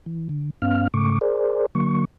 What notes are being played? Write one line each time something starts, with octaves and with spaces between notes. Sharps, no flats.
E3
D3
G2 B3 C#4 F5 F6
G#2 C#3 A3 C#6 D6
G#4 A#4 C5 D5
D3 F#3 A#3 C#6